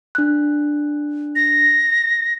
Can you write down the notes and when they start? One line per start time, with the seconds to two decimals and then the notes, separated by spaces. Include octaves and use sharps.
0.15 D4 F#6
1.36 A#6